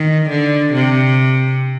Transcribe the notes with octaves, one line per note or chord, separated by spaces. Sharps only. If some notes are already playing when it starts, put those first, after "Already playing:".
Already playing: D#3
D3
C3